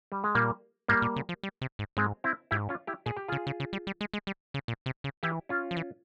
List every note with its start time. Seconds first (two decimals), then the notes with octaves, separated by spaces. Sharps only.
0.12 G3
0.24 G#3
0.35 A#2 G3 A#3
0.88 G#2 G3 A#3
1.02 A#2
1.16 C#3
1.29 F3
1.43 G3
1.62 C3
1.79 G#2
1.97 G#2 G#3 C4
2.24 C4 E4
2.51 G#2 E4 G4
2.69 C#4 F4
2.87 E4 G4
3.06 A#2 G#4
3.17 G4
3.28 C#3 F4 G#4
3.47 C#3
3.60 C#3
3.73 G3
3.87 G3
4.01 G#3
4.14 G#3
4.27 G3
4.54 C#3
4.68 A#2
4.86 C3
5.04 C#3
5.23 E3 E4 G4
5.49 C#4 F4
5.71 F3
5.77 E3